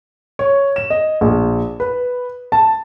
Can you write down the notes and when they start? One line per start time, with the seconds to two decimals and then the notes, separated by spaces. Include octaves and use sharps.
0.39 C#5
0.76 E7
0.90 D#5
1.21 A#1
1.80 B4
2.52 A5